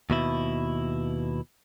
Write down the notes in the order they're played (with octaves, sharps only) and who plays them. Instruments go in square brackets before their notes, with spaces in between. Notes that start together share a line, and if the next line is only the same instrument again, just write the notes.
[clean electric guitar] D#2 B2 E4